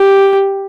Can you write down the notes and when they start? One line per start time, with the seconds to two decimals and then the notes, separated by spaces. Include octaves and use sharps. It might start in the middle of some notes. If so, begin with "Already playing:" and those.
Already playing: G4